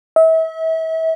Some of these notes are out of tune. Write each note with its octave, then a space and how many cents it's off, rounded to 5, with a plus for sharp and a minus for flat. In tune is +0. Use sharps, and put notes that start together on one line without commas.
E5 -35